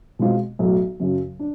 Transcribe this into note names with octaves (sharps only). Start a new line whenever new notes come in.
B2 G#3 C4 F4
B1 A2 F#3
F#2 C#3 F#3
D4